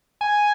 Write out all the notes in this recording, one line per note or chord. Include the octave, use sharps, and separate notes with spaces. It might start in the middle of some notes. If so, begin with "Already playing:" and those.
G#5